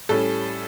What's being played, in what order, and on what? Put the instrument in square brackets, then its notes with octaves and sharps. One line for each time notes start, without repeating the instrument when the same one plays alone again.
[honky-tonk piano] A2 G3 C#4 A4